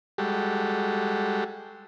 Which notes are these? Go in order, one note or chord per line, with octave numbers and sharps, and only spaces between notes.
G3 G#3 F#4 G4 A4